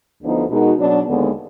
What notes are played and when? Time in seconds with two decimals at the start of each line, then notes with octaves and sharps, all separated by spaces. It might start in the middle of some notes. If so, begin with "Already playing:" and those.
0.21 D2 D3 F3 B3 D#4
0.50 B2 G#3 D#4 F#4 A#4
0.78 B2 F#3 D4
1.07 D#2 D3 G#3 B3